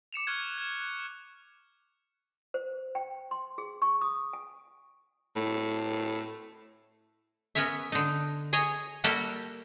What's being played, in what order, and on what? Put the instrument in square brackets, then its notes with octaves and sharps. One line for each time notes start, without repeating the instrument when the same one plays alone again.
[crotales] D6 C#7 E7 F7
C#6 F6 F#6 G#6
F#6 E7
[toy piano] C5
G5
C6
G#4
C#6
D#6
G#5
[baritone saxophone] A2
[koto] B3 C#4 A#4 C#5 E5
D3 D#4
G#4 C#5 D#5 G#5
G3 A#3 F#4 G4 A4 A#4